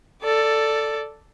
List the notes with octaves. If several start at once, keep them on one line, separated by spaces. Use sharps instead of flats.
A4 D5